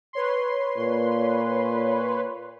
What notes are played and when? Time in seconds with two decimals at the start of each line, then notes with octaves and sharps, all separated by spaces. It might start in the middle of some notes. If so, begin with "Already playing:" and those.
0.13 B4 C#5 C6
0.77 A#2